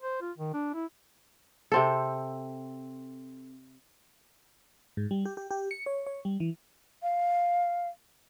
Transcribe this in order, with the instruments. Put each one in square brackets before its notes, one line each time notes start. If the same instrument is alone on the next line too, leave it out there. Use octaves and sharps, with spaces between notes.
[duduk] C5
F4
D#3
D4
E4
[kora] C3 C4 A4
[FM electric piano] G#2
G3
G4
G4
G4
C#7
C#5
C#5
G3
E3
[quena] F5